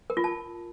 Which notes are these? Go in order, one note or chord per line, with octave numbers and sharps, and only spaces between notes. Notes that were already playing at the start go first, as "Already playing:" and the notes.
A#4
F4
A5